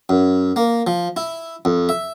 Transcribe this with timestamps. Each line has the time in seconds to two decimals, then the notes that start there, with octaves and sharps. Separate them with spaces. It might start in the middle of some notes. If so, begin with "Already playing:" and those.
0.09 F#2
0.56 A#3
0.87 F3
1.16 E4
1.65 F2
1.89 E5